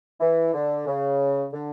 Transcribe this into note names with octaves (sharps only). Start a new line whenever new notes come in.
E3
D3
C#3
D3